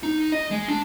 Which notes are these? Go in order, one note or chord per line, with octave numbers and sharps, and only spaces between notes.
D#4
D#5
G#3
D4